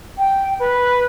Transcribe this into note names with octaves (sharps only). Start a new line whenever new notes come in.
G5
B4